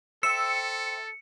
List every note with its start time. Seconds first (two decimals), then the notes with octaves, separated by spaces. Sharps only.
0.23 A4 C5 E5 G5 E6 C#7